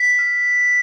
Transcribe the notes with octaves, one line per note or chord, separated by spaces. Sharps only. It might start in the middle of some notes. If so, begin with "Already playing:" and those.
Already playing: B6
F6